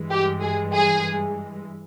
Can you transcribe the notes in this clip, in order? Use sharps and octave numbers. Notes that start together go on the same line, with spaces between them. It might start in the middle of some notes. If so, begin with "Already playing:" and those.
Already playing: G2 E3 G#3
G4
G#4
G#4